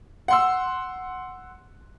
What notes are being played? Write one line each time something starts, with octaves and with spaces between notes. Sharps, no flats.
F#5 C6 E6